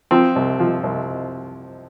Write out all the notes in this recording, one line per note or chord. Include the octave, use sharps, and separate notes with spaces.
F3 C4
C2
F3
C2